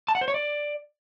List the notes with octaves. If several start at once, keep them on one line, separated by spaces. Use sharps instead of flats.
A5
F#5
C5
C#5
D5